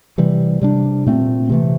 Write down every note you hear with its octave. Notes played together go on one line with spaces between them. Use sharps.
C3 E3 G3
C3 G3 D4
A#2 A3 C4
C3 E3 A3